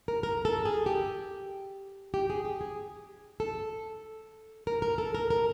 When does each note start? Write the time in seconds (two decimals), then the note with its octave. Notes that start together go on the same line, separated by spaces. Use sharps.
0.08 A#4
0.23 A#4
0.45 A4
0.65 G#4
0.86 G4
2.14 G4
2.30 G#4
2.45 G4
2.61 G#4
3.40 A4
4.67 A#4
4.82 A#4
4.98 A4
5.15 A#4
5.30 A#4